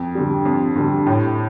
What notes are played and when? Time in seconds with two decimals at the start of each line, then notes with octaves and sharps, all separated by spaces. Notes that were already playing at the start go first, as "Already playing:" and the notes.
Already playing: F2
0.15 D3 G3
0.45 F2
0.76 D3 G3
1.06 A2